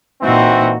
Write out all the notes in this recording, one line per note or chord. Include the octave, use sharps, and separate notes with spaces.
A#2 E3 C4 D#4 F#4